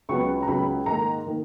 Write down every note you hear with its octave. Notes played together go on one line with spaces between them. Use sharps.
C#2 C#3 F#3 B3 C#6
A#5
C#2 C#3 F#3 B3 B5
G#2 D#3 A#3 A#5
D#3 A#3